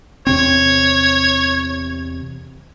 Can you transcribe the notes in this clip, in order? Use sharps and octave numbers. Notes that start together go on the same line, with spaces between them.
E2 C3 C4 C#5